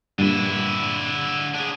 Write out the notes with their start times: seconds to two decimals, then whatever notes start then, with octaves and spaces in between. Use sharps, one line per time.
0.19 G2 A#2 D3 E4
1.54 D4 G#4